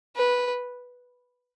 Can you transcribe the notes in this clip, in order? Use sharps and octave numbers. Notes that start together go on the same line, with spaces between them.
B4